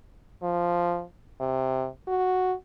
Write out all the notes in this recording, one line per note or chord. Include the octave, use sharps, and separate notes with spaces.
F3
C3
F#4